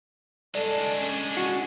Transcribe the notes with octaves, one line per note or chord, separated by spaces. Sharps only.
G#3 D4 A4 D5
C#4 G#5
F#4